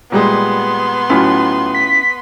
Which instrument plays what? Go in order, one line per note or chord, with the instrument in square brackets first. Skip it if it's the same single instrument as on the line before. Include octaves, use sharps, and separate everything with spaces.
[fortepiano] A#2 G3 G#3 [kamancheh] B3 C6
[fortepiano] A2 F#3 [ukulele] C#4 E4 F4
[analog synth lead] B6